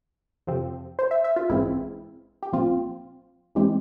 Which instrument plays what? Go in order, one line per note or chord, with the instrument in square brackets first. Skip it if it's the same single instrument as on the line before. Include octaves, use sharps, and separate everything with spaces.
[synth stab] F2 C3 F3 C4
C5
E5
E5
F4
A#1 G#2 E3 G#3 C4 E4
G4
A#1 A#2 F3 C4 F4
E2 E3 G#3 C4 G4